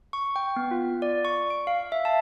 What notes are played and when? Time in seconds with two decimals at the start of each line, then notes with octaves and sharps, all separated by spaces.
0.13 C#6
0.36 G5
0.56 B3
0.71 F4
1.02 D5
1.25 C#6
1.50 D7
1.67 F5
1.92 E5
2.05 A5